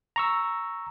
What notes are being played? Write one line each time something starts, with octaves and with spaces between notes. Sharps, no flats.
A#5 C#6 E6